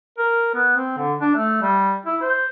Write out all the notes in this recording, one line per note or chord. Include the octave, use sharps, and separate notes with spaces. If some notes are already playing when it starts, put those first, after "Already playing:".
A#4
B3
C4
D3
D4
A3
G3
E4
C5